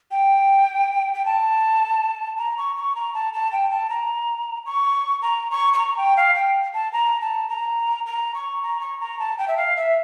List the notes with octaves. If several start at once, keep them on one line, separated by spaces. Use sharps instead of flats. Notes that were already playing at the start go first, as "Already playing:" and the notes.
G5
G5
A5
A#5
C#6
C#6
A#5
A5
A5
G5
A5
A#5
C#6
A#5
C#6
C#6
A#5
G5
F5
G5
A5
A#5
A5
A#5
A#5
C#6
A#5
C#6
A#5
A5
G5
E5
F5
E5